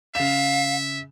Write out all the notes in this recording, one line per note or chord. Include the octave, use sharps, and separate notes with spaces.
C#3 E5 F5 E7